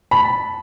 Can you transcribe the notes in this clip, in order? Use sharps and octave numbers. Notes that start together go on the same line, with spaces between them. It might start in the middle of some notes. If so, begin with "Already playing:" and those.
A5 B5